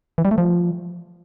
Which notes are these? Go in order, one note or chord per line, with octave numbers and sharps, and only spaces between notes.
E3
G3
A3
F3